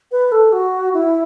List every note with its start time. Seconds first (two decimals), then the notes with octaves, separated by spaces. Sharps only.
0.12 B4
0.32 A4
0.52 F#4
0.94 E4